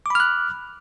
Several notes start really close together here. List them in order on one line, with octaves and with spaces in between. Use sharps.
D6 B5 F6 F#6